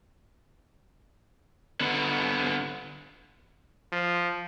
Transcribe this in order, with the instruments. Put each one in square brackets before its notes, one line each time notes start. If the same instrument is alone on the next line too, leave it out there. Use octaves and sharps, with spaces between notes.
[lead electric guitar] D3 B3
[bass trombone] F3